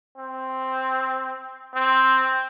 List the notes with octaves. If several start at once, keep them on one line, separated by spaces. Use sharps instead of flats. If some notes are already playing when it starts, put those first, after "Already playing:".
C4
C4